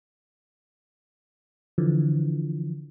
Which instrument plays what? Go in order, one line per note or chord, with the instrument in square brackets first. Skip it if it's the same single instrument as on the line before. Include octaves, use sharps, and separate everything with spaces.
[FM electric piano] D3 E3 F3